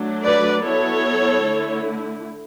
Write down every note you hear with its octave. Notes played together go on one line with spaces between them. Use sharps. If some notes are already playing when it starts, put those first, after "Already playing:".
Already playing: F#3 A3 D4
B4 D5
F#3 B3 E4 A4 C#5
D3 A3 E4